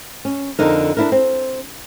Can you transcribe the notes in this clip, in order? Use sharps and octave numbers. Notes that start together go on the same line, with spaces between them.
C#4
F2 D3 D#4 A#4
D4 E4 A#4
C4